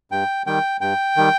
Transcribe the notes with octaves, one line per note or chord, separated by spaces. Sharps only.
G2 G5
D#3 G3 G5
G2 G5
D#3 G3